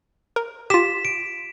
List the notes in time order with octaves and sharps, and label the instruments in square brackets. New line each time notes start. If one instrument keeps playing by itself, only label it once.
[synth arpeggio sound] A#4
[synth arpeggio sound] F4 G4 [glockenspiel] B6 E7
[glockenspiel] D7